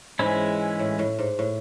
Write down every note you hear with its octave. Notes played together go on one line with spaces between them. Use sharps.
G#2 E3 G#3 C#4 E4
A2
A2
G#2
A2